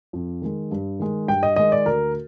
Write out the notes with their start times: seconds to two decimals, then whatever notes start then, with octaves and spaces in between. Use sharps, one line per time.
0.13 F2
0.42 D#3 G#3
0.71 G2
0.99 D#3 G#3
1.28 G2 G5
1.43 D#5
1.56 D#3 G#3 D#5
1.72 D5
1.86 D2 A#4